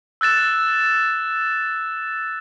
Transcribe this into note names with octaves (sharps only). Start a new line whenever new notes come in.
E6 F#6 A6 E7